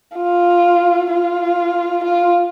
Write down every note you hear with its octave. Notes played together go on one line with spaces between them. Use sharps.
F4
F4
F4